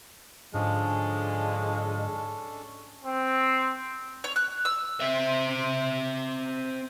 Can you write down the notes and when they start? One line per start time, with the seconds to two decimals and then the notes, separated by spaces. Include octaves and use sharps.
0.54 G#2 D3 F3 G#3 C#4 D4 A4
3.05 C4
4.24 C#5
4.36 F#6
4.65 E6
5.00 C4 E5